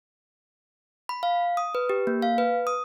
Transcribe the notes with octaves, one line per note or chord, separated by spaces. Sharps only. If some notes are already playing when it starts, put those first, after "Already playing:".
B5
F5
D#6
B4
G4
A#3
F5
B4
D#6